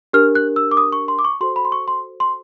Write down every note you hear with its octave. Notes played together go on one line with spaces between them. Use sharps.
D4 G4 A#4 F6
F#6
E6
D6
D#6
C#6
C6
D6
C#6
F#4 A4 C5 C6
B5
C6
C#6
C6
C6